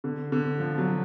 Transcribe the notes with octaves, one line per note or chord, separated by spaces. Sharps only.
D3
D3
F3
F#3